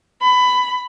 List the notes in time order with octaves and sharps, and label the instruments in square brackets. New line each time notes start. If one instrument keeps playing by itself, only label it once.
[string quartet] B5